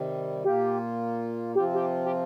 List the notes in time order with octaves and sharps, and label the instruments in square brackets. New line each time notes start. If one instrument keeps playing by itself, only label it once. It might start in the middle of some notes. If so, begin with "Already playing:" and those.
Already playing: [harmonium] C3 D#3 G3
[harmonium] A#2 A#3 F4 [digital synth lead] G4
[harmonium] C3 F3 C4 F4 [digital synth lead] G4
[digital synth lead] G4
G4